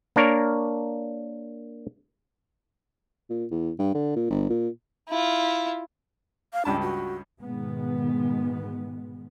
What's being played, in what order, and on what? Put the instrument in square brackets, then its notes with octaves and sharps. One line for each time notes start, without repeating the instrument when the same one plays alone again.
[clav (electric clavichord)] A#3 D4 A#4 C#5
[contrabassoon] A#2
E2
G2
D3
A#2
G1
A#2
[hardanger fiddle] E4 F4
[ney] F5
[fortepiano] C#2 G2 A5 [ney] D4
[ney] F#4
[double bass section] G#2 B2 D#3 G#3 B3